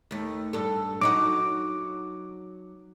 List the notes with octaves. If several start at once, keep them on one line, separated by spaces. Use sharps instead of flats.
D#2 A3
G2 A4
F#3 D#4 F#4 D6